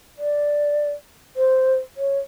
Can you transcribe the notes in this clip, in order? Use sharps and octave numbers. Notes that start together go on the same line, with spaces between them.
D5
C5
C#5